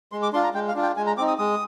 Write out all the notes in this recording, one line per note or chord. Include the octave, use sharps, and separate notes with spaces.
G#3 C6
D6
D4 F4 C6
A#5
G#3 G5
F5
D4 F4
G5
G#3 G#5
A#5
C4 D#4 D6
D#6
G#3 D#6